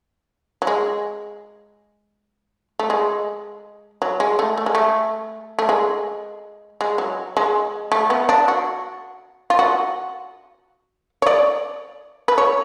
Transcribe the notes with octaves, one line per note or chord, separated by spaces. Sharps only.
F#3
G#3
A3
G#3
F#3
G#3
A3
A3
G#3
A3
A3
G#3
G#3
F#3
G#3
A3
B3
D4
F#4
F4
F#4
C#5
D5
B4
C#5